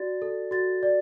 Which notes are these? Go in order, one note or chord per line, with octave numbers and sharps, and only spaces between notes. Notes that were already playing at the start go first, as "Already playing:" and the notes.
Already playing: F#4 D5 A6
A4
F#4 A6
D5